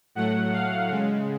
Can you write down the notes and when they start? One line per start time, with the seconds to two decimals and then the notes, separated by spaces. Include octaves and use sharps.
0.15 A2 F#3 A3 F#5
0.53 F5
0.89 C#3 G#3